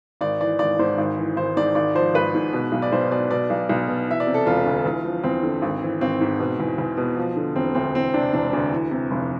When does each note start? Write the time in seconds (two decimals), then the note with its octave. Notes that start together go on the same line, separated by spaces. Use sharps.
0.21 G#1 D5
0.40 E3 D5
0.59 G#1 D5
0.79 G#2 C5
0.98 G#1
1.18 E3
1.37 G#1 C5
1.57 G#2 D5
1.75 G#1 D5
1.95 F3 C5
2.14 G#1 B4
2.34 G#2
2.53 B2
2.72 B1
2.82 D5
2.92 B1 C5
3.11 B2 D5
3.30 B2 D5
3.50 B1
3.69 B1
3.88 B2
4.08 E3 E5
4.20 D5
4.27 C3
4.34 A4
4.46 E1 F4
4.66 D2
4.85 E2
5.05 F3
5.24 E2 C4
5.43 D3
5.62 G#1
5.82 E3
6.01 G#1 C4
6.21 G#2
6.39 B2
6.60 E2
6.78 E2
6.97 B2
7.17 F3
7.37 D3
7.55 E1 C4
7.75 D2 C4
7.94 E3 C4
8.14 C3 D4
8.33 E1 D4
8.53 D2
8.72 E3
8.91 C3
9.11 F1